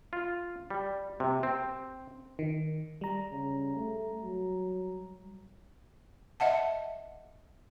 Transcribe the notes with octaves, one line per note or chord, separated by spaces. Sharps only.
F4
G3
C3
C4
D#3
G3 A#5
C#3
A3
F#3
D#5 E5 F#5 A5